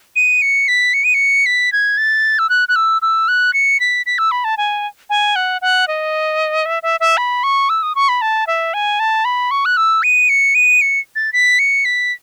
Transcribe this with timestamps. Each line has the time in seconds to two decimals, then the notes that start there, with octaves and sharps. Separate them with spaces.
0.16 D#7
0.42 C#7
0.68 B6
0.94 C#7
1.04 D#7
1.14 C#7
1.46 B6
1.73 G#6
1.98 A6
2.39 E6
2.50 F#6
2.69 F#6
2.76 E6
3.02 E6
3.28 F#6
3.54 C#7
3.80 B6
4.06 B6
4.18 E6
4.31 B5
4.44 A5
4.58 G#5
5.10 G#5
5.36 F#5
5.62 F#5
5.88 D#5
6.66 E5
6.83 E5
7.00 E5
7.17 B5
7.44 C#6
7.70 E6
7.83 D#6
7.95 C#6
8.09 B5
8.22 A5
8.47 E5
8.74 G#5
9.00 A5
9.25 B5
9.51 C#6
9.65 F#6
9.77 E6
10.03 D#7
10.29 C#7
10.55 D#7
10.81 C#7
11.16 A6
11.33 B6
11.59 C#7
11.85 B6